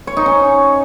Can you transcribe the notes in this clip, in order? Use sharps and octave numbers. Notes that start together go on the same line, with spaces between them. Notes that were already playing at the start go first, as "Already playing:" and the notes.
C#5
D#4
C#4